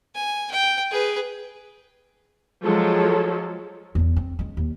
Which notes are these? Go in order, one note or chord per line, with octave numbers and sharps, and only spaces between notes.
G#5
G5
G#4 B4
F3 F#3 G#3 A4
E2 C#3
C4
G#3 C#4
D#2